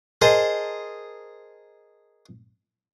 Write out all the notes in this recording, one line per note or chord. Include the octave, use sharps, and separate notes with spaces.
G#4 A#4 C5 D#5 A5